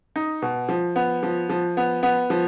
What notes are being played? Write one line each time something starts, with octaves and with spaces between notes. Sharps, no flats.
D#4
B2
F3
B3
F3
F3
B3
B3
F3